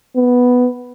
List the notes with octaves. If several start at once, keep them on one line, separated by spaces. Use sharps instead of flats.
B3